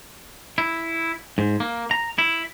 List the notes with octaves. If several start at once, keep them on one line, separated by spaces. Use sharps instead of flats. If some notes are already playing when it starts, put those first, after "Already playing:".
E4
G#2
A#3
A#5
E4